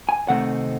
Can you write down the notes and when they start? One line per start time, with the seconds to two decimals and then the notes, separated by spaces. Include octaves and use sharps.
0.09 G#5
0.28 C3 D#3 A3 C4 D#4 F#5